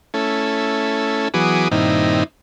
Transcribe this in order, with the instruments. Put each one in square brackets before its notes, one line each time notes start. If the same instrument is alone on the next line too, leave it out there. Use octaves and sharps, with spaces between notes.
[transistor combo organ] A3 C#4 E4 A4
E3 F#3 B3 G#4 D6 D#6
G2 A#2 D#3 C4 D#4 E4